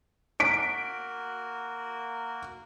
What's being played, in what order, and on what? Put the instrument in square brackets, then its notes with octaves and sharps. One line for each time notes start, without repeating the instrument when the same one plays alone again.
[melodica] A#3 F#4 A#4 [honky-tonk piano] B6 D7